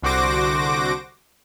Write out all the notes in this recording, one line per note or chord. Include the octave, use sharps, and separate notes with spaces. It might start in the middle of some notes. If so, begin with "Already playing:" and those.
C2 D3 F#4 C5 D6 A#6